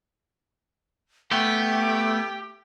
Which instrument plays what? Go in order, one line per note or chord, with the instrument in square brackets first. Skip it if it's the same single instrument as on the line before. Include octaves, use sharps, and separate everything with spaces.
[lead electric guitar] A3 B3 [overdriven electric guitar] G4 [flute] G5